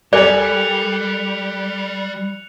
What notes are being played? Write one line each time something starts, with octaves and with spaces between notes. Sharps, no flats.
G3 A4 A#4 D5 G#5 F#6 C#7 F7